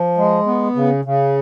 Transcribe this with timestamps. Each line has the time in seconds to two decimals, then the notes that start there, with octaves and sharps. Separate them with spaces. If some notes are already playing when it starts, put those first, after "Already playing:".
Already playing: F3
0.17 G#3
0.46 B3
0.76 C#3
1.05 C#3